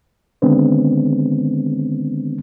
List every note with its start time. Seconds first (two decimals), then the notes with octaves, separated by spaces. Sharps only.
0.42 D3 D#3 G#3 B3 C4 D4